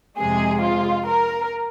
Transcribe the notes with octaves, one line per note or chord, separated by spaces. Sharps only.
F2 C3 G#3 G#4
F4
A#4